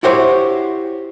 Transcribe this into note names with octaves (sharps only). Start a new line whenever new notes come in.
E4 F#4 G4 C5 C#5